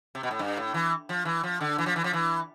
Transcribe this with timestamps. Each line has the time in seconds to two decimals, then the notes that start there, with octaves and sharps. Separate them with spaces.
0.15 C3
0.23 B2
0.31 A2
0.39 G2
0.57 A2
0.74 E3
1.09 F3
1.25 E3
1.43 F3
1.61 D3
1.78 E3
1.86 F3
1.96 E3
2.04 F3
2.13 E3